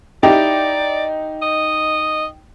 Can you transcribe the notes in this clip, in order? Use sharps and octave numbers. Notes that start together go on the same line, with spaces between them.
D#4 E4 G4 D5 G5
D#5